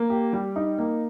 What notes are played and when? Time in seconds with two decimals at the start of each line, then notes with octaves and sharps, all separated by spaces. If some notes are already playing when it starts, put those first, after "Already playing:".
Already playing: A#3
0.10 G4
0.33 G3
0.56 D#4
0.78 A#3